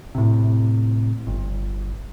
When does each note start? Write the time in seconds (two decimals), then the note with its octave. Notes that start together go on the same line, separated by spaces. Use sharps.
0.15 A2 C3
1.27 G1